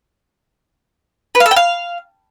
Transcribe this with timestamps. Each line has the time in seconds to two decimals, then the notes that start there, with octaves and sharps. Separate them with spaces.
1.35 B4
1.40 F5
1.46 A4
1.51 G5
1.56 F5